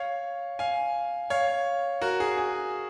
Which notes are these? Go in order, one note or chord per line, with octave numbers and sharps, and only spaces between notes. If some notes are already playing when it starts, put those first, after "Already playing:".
Already playing: C#5 F5
F5 G#5
C#5 F5
F#4 A#4
G#4
G#4